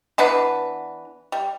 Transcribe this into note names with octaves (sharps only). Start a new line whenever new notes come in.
E3 B3 D4 B4
G3